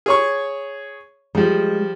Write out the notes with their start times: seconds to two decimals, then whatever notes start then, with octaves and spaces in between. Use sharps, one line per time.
0.06 G#4 C#5 C#6
1.35 F3 G3 G#3